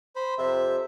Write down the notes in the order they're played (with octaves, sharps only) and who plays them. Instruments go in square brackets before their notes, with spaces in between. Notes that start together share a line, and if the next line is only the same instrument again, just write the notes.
[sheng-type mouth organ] C5 B5
[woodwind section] F2 C3 [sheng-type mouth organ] E5